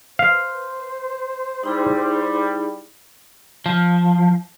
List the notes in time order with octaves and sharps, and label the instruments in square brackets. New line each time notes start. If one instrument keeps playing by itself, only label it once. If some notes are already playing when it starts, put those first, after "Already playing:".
[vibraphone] B4 [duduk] C5 [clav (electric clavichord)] F5
[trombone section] G3 [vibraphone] D#4 E4 G#4
[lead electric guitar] F3